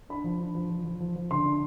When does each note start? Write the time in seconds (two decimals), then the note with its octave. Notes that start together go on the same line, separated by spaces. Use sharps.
0.09 D4 B5
0.24 F3
0.39 D4
0.55 F3
0.70 F3
0.85 F3
1.00 F3
1.16 F3
1.31 D3 C6
1.45 D4